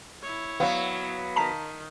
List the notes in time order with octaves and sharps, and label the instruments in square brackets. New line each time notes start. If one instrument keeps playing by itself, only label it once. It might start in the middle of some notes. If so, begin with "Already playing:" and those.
[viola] E4 C#5
[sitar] F#3 B3 [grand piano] F5
[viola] D#3 [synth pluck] A5 A#5 B6